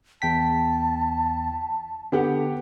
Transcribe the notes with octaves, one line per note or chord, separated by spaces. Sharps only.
E2 G5 A5 B6
D3 B3 G4 F#5